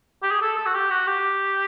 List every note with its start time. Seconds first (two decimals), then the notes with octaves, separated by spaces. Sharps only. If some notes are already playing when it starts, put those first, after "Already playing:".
0.23 G4
0.31 G#4
0.41 A4
0.57 A4
0.66 F#4
0.74 G4
0.91 F#4
1.07 G4